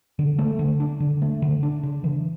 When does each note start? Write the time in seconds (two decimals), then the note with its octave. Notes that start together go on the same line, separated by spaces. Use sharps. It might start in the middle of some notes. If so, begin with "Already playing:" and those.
0.19 D3
0.39 A3
0.59 D3
0.80 D4
1.00 D3
1.22 A3
1.42 D3
1.63 D4
1.83 C#3
2.04 E3